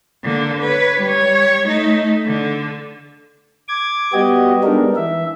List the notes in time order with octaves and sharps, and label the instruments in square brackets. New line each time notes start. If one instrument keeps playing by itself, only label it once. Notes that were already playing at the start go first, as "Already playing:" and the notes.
[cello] D3 A#3
B4 C#5
G3 C#5
A3 D#4
D3
[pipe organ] D6 G#6
G3 B3 F#4 G4 D#5
G3 G#3 B3 D4 D#4 A#4
E3 E5